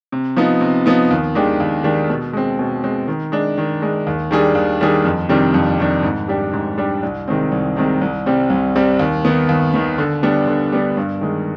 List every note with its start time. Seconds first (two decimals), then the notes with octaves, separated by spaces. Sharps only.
0.12 C3
0.36 F3 B3 D#4
0.61 C3
0.86 F3 B3 D#4
1.11 D#2
1.35 D#3 G#3 D4 G4
1.60 D#2
1.84 D#3 G#3 D4 G4
2.10 B2
2.33 G#3 C4
2.59 B2
2.84 G#3 C4
3.08 D#3
3.32 G#3 D4
3.58 D#3
3.82 G#3 D4
4.07 D#2
4.31 D#3 G3 D4 G#4
4.55 D#2
4.81 D#3 G3 D4 G#4
5.05 F2
5.29 C3 D#3 G3 D4
5.54 F2
5.79 C3 D#3 G3 D4
6.03 G#2
6.28 G3 D4 G4
6.53 G#2
6.78 G3 D4 G4
7.03 C2
7.28 C3 D#3 G#3 C4
7.52 C2
7.76 C3 D#3 G#3 C4
8.01 C2
8.26 C3 G3 C4
8.50 C2
8.75 C3 G3 C4
8.99 D#2
9.25 D#3 B3
9.49 D#2
9.74 D#3 B3
9.98 D3
10.23 G3 B3 D4
10.47 D3
10.72 G3 B3 D4
10.97 G2
11.21 D#3 G#3